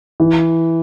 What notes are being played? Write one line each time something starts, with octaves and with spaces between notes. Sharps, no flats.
E3